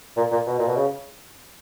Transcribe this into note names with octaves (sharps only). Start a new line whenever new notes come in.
A#2
A#2
B2
A#2
B2
C#3